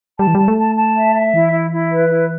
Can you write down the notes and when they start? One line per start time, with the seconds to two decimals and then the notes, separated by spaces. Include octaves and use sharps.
0.19 G3 A5
0.27 E3
0.35 G3 A5
0.48 A3
0.58 A5
0.77 A5
0.96 E5
1.15 E5
1.34 E3 E4
1.53 E4
1.71 E4
1.91 B4
2.09 E4